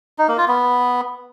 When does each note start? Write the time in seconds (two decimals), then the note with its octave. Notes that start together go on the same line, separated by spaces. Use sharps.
0.18 D#4
0.28 A#3
0.38 F4
0.48 B3